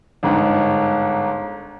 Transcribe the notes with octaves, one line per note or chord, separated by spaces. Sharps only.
G1 G#2